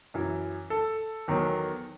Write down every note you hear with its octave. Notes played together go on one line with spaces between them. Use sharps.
F#2 E3
A4
E2 D#3 F#3